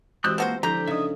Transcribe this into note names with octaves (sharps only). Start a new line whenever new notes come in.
E3 G#3 C4 F#4 G4 D#6 F#6 G6
F3 A#3 F#4 B4 C5
D3 F3 E4 G4 A#5 G6
C#3 D#4 D#5 E5 D#6